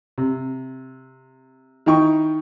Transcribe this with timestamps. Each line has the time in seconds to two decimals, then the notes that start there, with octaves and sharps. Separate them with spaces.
0.18 C3
1.86 D#3 D#4 E4 G5 C#6